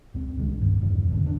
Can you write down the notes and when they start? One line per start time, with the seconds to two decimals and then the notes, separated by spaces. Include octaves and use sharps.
0.14 C#2 C4
0.37 C2 D#3 G#3
0.61 D#1 G2
0.81 E2 G2 C#3 E3
1.08 A1 E2 G#2 D3
1.24 G1 C#2 D#3 D4